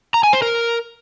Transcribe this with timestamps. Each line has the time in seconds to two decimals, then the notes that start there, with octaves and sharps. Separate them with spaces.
0.14 A#5
0.24 G#5
0.33 C5
0.42 A#4